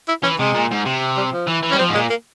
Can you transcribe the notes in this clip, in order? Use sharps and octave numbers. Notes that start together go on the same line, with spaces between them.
E4
E3 C#4
C3 G#3
A#2
G#2
C3
G3
F3
E3
E3
G3 C#4
F3 C4
G#2
A#2 G#3
A#3